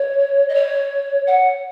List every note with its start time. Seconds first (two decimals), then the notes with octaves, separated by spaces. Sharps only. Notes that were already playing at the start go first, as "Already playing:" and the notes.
Already playing: C#5
0.49 D#5
0.54 C#5
1.27 F#5